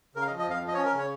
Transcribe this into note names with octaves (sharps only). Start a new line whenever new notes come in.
C#3 A#4
F5
D#5
F3
D#5
F2 F5
F3
D#5
C#4 C#5
A#4
C#3 C#5